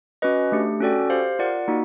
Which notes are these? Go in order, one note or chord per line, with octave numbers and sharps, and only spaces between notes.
C#4 F#4 B4 D#5
A3 D4 G4
C#4 F#4 A4 D5 G5
G4 C5 F5
F4 A#4 D5 F#5
A#3 D#4 F#4